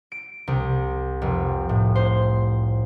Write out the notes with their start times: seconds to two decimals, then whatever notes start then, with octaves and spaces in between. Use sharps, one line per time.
0.12 D7
0.47 C2
1.22 F1
1.69 A2
1.95 C5